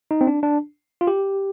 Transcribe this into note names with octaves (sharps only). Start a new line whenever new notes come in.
D#4
C4
D4
D4
F4
G4